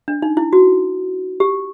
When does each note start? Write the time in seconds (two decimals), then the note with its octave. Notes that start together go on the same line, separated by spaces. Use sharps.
0.08 D4
0.22 D#4
0.37 E4
0.53 F#4
1.40 G4